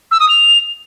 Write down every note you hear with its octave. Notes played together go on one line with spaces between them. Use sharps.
E6
D#6
F7